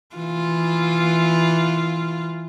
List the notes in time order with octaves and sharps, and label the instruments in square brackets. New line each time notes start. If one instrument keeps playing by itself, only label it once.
[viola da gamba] E3 F4